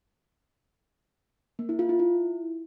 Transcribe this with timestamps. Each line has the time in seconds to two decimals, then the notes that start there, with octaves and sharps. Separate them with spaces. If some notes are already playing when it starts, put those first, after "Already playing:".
1.59 A#3
1.69 E4
1.79 F4
1.89 E4
1.99 E4